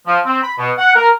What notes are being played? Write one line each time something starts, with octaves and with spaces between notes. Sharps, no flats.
F3
C4
B5
B2
F#5
A#4